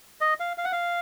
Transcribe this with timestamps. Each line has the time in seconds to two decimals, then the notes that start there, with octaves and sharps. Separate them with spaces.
0.21 D#5
0.40 F5
0.58 F5
0.65 F#5
0.72 F5